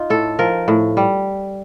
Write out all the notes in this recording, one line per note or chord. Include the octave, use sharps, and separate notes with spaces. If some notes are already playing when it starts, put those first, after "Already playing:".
Already playing: D#4 F4
A2 A4
F3 A#4
A2
G3